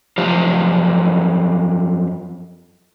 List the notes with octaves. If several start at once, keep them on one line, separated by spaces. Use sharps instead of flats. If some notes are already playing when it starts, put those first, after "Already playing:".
F#2 F3 F4 G4 C5